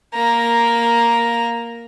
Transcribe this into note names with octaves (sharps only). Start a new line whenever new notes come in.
A#3 A#5